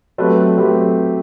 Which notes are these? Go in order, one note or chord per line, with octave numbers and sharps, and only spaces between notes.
F#3 A3 C4 G4 B4
F#3 A3 C4 G4 B4